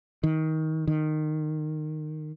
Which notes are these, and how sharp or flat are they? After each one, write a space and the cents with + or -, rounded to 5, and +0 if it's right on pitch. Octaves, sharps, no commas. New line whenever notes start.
D#3 +20
D#3 -15